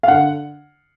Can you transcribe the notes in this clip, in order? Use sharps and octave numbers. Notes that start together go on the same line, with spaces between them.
F5
D3 F#5